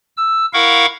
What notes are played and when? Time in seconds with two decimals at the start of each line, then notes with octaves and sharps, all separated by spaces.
0.17 E6
0.53 E4 A#4 F5 F#5 C#6